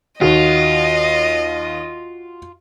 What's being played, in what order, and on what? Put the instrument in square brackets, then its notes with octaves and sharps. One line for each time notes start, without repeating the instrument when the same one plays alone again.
[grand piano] D#2 D#3 [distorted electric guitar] F4 [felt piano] F#4 [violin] D#5